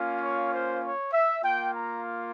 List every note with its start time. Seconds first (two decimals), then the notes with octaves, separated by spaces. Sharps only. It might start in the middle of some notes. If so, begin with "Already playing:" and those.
Already playing: A#3 C#4 F4
0.21 C#5
0.51 C5
0.82 C#5
1.12 E5
1.43 A#3 F4 G5
1.73 A#5